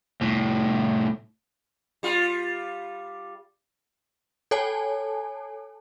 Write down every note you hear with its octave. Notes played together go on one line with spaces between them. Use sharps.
C2 A2
G3 F4
A4 C#5 G#5 A5